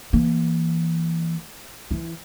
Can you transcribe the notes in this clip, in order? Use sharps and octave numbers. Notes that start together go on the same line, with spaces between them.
E3 A#3
E3 E4